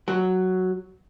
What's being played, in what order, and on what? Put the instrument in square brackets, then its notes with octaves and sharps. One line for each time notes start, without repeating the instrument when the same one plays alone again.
[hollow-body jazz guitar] F#3